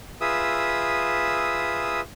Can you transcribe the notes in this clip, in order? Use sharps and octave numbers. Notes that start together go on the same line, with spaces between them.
F4 G#4 B4 E5 D#6 E6